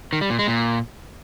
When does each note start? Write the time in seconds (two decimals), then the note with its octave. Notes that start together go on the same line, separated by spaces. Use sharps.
0.13 D#3
0.21 G3
0.30 A#2
0.39 G#3
0.48 A#2